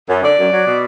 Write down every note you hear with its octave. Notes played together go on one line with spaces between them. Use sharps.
F#2
D3 D5
F#2
F#3
B2